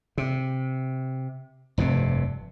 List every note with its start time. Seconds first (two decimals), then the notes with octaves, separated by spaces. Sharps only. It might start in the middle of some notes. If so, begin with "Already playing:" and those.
0.18 C3
1.78 F1 G2 C3